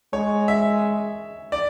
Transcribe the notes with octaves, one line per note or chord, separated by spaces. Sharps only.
G#3 C#5
E5
D5